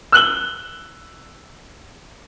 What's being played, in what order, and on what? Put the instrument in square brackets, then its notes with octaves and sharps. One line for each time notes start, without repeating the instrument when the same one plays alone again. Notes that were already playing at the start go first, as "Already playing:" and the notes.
[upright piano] E6 F#6 F#7 G7